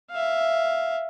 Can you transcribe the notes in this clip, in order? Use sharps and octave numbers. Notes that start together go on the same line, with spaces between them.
E5 F5